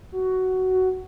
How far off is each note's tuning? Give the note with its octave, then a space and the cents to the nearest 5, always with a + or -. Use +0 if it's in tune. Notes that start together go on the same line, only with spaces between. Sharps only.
F#4 +10